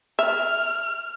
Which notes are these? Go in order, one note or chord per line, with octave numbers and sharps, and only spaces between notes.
E5 F6